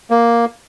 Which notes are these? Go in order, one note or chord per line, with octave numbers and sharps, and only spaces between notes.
A#3